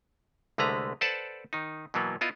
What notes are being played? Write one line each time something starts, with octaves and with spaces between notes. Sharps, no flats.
C2 D3 G#3 A3 B4 A#5
A4 B4 C5 D5 F#5 A5
D#3 D#4
B2 E3 F#3 A#3 B3
B3 E4 F4 D#5